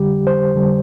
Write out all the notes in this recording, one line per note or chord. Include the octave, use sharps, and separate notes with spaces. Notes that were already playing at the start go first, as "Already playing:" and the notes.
Already playing: F2 D3 G3 G4
C5
F2 D3 G3